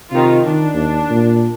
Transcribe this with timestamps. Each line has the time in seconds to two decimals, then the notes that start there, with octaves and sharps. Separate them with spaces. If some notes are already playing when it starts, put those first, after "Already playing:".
0.12 C3 D#3 F4
0.46 D#3 D4
0.74 D#2
1.11 A#2